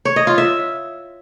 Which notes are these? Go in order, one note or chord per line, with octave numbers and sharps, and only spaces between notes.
C#5
D#5
F4
E5